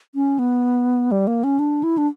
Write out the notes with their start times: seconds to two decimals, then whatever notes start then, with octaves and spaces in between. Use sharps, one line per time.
0.15 C#4
0.39 B3
1.12 G3
1.27 A#3
1.44 C#4
1.59 D4
1.83 E4
1.98 D4